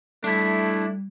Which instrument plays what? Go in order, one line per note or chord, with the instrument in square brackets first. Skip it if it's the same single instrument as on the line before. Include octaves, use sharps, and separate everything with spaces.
[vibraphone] G3 [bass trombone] A3 [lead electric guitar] D4 E4